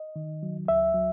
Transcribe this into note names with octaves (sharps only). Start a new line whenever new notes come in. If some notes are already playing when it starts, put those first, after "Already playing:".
Already playing: D#5
D#3
F#3
C#2 E5
F#3